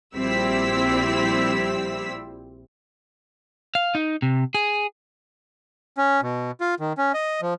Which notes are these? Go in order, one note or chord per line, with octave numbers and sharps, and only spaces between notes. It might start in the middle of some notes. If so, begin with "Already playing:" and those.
A#1 G3 C4 E4 E6 B6
F5
D#4
C3
G#4
C#4
B2
F4
D#3
C#4
D#5
F3